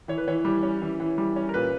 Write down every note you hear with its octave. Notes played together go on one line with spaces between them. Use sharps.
E3 C#5
B4
E3 C#5
G3
C#4
E3
E3
G3
C#4
A#4
A#2 B4